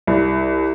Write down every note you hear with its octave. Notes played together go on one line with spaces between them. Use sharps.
C2